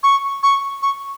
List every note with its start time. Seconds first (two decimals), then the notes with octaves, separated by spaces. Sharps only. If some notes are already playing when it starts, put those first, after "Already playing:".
0.03 C#6
0.43 C#6
0.82 C#6